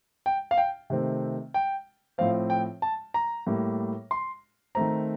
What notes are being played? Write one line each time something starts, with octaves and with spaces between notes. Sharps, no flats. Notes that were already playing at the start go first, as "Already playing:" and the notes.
G5
F5
G5
C3 D#3 A3 C4
G5
A2 F3 C4 F5
G5
A5
A#5
A2 G3 A#3
C6
D#3 A3 C4 A#5